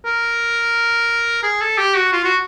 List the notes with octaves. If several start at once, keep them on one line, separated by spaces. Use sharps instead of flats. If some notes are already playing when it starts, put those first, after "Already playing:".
A#4
G#4
A4
G4
F#4
F4
F#4